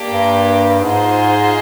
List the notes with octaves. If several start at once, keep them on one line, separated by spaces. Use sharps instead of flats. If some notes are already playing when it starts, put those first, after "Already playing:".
Already playing: A#3 D4 G4 D5
G2
G#2 F4 G#4 C5 D#5